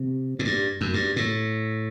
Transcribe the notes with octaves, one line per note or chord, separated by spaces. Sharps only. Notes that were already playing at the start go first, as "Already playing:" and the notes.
Already playing: C3
A2
G2
F#2
G2
A2